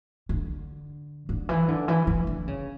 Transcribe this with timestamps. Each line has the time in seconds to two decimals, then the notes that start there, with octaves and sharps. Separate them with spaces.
0.29 D3
1.29 D3
1.49 E3
1.68 D3
1.88 E3
2.07 E3
2.27 D3
2.48 C#3